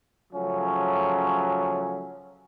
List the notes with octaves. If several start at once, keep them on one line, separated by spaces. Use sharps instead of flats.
C#3 F3 F#3 A3 C#4